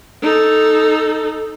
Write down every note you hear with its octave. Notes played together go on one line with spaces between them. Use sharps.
D#4 A4